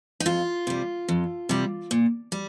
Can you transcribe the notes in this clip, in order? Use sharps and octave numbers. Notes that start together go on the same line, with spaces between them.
D#4
F2 F4
C3 G3
F2
C3 G3
A#2
G3